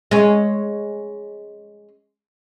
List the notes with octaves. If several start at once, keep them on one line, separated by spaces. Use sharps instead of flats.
G#3 C#4